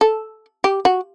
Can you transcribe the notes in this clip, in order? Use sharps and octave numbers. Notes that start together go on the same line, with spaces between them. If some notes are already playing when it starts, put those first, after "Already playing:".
A4
G4
F#4